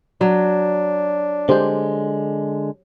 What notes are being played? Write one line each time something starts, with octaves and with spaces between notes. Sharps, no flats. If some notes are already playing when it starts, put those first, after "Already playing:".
F#3 D4
D3 G#3 G4 C5